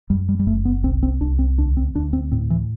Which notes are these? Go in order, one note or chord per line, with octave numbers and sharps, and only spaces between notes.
F#2 G3
G3
G3
F#1 A3
B3
C2 C4
C4
C2 D4
C4
D2 D4
C4
D2 D4
C4
A2 C4
E3